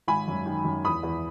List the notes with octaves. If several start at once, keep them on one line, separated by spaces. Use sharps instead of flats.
G#1 G#5 B5
F#2
D#3
F#2
E2 B5 D#6
E2